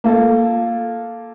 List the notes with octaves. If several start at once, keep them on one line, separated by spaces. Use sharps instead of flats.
A#3 F4 A4